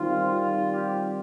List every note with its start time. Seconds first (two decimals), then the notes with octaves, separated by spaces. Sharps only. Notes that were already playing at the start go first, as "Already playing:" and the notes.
Already playing: D#3 G3 C4 F4
0.29 F4
0.73 G4